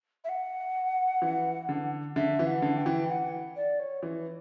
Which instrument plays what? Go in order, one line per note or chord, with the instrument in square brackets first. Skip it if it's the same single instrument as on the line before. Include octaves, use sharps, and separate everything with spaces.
[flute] E5
F#5
[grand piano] E3
D3
[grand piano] D3 [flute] E5
[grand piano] E3
[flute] F#5
[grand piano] D3
[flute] G5
[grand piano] E3
[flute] F#5
D5
C#5
[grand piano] E3